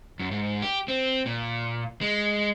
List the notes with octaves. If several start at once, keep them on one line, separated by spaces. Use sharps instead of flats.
F#2
G#2
G4
C4
A#2
G#3